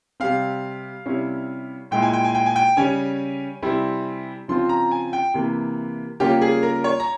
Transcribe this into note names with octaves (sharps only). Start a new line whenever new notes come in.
C3 G3 C4 F5
C3 G3 C#4 E4
A#2 G#3 E4 G5
G#5
G5
G#5
G5
G#5
G5
C#3 G3 C#4 G#5
C3 G3 C4 E4
C#3 F3 C4 F4 C6
A#5
G#5
G5
C3 E3 A#3
C#3 G3 A#3 C#4 F4 G4
G#4
A#4
C#5
A#5